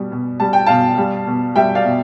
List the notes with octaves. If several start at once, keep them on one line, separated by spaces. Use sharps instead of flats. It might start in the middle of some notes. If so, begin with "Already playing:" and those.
Already playing: B2 G3
B2
G3 A5
G5
B2 F5 A5
G3
B2
G3 E5 G5
D5 F5
B2